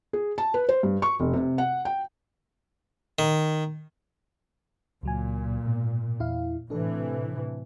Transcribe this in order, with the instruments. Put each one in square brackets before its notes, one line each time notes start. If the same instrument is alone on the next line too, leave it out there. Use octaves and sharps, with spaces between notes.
[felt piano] G#4
A5
B4
C5
G2
C#6
F1
C3
F#5
G5
[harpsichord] D#3
[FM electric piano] C#2 F#3 G#5 [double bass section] A#2
[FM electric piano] G#2 B2
E2 E4 F5
[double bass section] A2 C3 E3 [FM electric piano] D4 A4